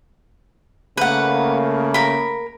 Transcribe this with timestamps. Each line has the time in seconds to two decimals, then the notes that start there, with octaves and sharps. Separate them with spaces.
0.97 C#3 A3 A#3 B4 F#5
1.94 A#4 B5